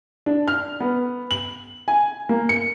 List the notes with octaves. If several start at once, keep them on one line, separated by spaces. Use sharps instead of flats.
D4
F6
B3
F#7
G#5
A#3
C#7